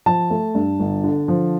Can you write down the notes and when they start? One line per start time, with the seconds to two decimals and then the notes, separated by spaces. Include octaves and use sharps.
0.06 F3 A5
0.30 A3
0.55 G2
0.80 G1
1.04 D3
1.28 F3